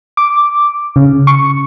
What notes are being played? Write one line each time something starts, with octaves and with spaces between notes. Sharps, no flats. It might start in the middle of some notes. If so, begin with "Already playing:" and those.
D6
C#3
C#6